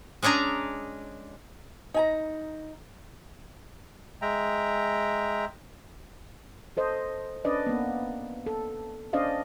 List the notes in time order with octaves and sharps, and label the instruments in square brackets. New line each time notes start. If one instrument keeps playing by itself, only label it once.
[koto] G#3 C#4 D4 G#4 A#5
[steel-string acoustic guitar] D#4 G#5 A#5
[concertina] G#3 E5 G5 A#5
[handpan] A4 C5 D#5
C#4 D4 B4 D5 D#5
A#3 B3
A4
C#4 D4 C5 D5 D#5 F5